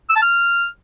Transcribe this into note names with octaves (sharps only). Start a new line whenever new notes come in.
E6
A5
F6